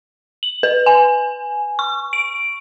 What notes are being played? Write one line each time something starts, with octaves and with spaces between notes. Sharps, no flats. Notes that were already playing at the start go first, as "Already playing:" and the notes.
F#7
B4
G#5
C#6
D7